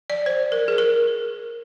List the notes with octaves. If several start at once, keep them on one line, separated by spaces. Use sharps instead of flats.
D5
C5
A#4
G#4
A#4